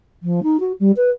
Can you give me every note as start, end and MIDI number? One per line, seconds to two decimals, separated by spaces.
0.23 0.40 53
0.43 0.57 63
0.60 0.73 66
0.80 0.91 55
0.97 1.11 71